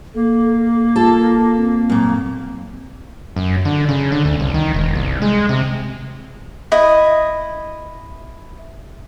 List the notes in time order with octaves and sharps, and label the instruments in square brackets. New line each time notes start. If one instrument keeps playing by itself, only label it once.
[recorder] A#3 [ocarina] A4
[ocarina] F4 [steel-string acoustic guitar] A4 A5
[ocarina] C4
[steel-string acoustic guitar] F#2 A#2
[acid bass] F#2
D3
C#3
D3
D2
C2
D#3
E1
C2
G#3
C3
[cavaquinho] E4 D#5